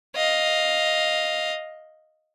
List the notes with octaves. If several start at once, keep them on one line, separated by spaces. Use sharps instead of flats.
D#5 F5